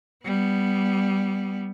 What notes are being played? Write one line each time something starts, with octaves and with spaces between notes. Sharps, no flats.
G3 B3